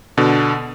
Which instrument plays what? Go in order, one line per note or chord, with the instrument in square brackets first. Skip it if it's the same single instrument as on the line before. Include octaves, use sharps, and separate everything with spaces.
[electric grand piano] B2 D3